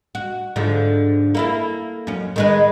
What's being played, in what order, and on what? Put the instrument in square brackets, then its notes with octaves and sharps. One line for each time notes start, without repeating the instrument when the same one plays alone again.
[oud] F#4
G#2 D3 F3
A#3 E4 A4
F#2 C#4
D#3 G#3 B4